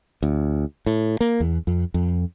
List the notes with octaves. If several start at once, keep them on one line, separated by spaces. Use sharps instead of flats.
D2
A2
A#3
E2
F2
F2